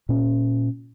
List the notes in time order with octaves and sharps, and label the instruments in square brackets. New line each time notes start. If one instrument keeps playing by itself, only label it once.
[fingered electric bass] A#2 C#4